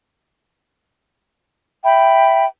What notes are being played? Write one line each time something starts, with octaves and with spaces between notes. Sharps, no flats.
E5 G5 B5